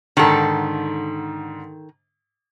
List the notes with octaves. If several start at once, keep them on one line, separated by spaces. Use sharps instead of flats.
G#2 D3 D#3 A4